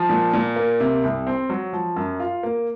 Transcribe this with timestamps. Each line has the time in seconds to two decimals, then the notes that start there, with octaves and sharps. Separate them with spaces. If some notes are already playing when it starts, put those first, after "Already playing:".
Already playing: F3
0.09 A#2
0.34 A#2
0.56 A#3
0.80 C3
1.04 C2
1.27 C4
1.50 F#3
1.73 F3
1.96 F#2
2.20 F4
2.43 A#3